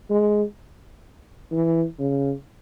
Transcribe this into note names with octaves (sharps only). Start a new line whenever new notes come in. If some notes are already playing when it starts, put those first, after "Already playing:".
G#3
E3
C#3